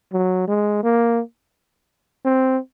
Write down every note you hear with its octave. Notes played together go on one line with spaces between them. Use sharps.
F#3
G#3
A#3
C4